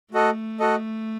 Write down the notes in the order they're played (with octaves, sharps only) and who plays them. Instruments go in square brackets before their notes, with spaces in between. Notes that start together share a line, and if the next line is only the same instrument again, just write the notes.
[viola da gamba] A3 [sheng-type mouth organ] F#4 A4 D#5
[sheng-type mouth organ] F#4 A4 D#5